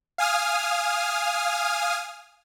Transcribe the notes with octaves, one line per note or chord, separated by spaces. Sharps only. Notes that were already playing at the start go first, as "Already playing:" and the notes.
F5 G#5 D#6 F6